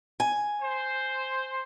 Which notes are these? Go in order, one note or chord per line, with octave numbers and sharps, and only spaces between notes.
G#5
C5